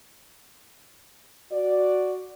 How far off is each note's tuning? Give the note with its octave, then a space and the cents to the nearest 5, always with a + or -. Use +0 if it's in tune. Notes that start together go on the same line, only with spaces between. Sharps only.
F#4 +0 D5 +0